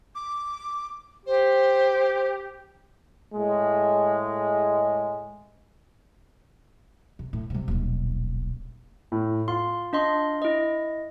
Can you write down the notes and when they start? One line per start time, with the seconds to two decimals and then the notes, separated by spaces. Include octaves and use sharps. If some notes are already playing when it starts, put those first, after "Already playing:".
0.15 D6
1.26 G4 C5
3.34 A2 G#3
7.19 C3
7.33 A2
7.50 C3 G3
7.68 D#1 B1
9.12 A2
9.48 F4 C6
9.93 D4 D#5 C6
10.42 E4 D#5